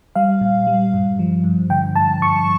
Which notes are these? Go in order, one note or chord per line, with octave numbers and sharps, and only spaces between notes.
G3 F5
A#2
G3
G2
F3
G2
D3 G5
G2 A5
G2 C#6